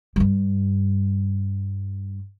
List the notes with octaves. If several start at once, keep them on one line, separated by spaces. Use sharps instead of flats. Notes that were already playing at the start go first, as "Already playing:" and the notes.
G2 G3